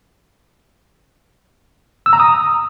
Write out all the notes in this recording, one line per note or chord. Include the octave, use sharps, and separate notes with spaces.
E6
A#5
D#6